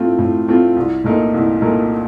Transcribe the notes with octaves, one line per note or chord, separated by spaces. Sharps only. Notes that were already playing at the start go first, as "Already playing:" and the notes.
Already playing: A2 A3 C4 F4
A2
A3 C4 F4
C2
A#2 A3 D#4 A#4
C2
A#2 A3 D#4 A#4